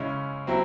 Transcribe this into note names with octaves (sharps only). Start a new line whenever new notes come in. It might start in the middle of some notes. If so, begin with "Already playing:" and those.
Already playing: C#3 G#3 C#4 E4
F#3 C4 E4